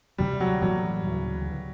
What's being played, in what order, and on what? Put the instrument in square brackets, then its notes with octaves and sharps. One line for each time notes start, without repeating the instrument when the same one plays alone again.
[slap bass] D2 C3 D#3 [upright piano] G3
[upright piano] F#3
[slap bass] A2 E3 G3 A#3 [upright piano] F#3
[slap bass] D2 C#3 E3